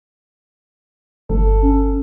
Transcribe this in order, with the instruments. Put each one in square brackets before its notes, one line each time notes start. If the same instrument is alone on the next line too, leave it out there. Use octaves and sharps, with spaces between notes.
[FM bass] G1 [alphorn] A4
[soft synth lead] C#4